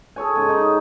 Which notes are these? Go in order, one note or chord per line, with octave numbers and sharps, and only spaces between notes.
G#4 A4 C#5 G#5
G#2 C#3
D#4 D#5